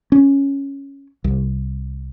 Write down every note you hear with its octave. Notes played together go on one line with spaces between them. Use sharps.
C#4
C2